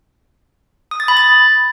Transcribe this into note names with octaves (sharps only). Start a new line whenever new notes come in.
D#6
A6
B5
A6